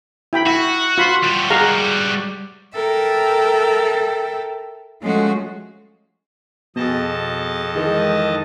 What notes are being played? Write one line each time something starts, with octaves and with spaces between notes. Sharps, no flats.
E4 G5 B5
E4 F#4
F4 B5 C6
G3 F#4
G#4 F5 A#5
A4 A#4 E5 G5
F3 G#3 A3 C#4 F#4
F2 B2 G#4 D#5 A5
D#3 E3 G#3